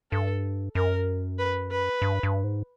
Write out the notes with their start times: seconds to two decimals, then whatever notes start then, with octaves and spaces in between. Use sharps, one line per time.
0.11 G2 A4
0.75 F#2 A#4
1.39 B4
1.71 B4
2.02 G2
2.23 G2
2.44 G#2